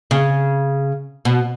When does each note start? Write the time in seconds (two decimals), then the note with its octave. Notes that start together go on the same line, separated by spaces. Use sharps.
0.11 C#3
1.25 B2